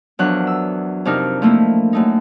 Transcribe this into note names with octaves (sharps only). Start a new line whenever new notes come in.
E2 F3 F#3 D4 A#4 F#6
E6
F2 C3 D4 D#4 A#4 F6
F3 A3 A#3 E4
F#2 A3 D#4